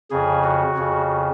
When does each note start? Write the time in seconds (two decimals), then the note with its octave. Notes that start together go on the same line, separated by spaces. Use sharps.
0.11 F2 C#3 G#4
0.44 F#4
0.77 F2 C#3